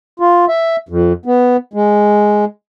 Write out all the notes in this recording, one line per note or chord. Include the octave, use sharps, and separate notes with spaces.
F4
E5
F2
B3
G#3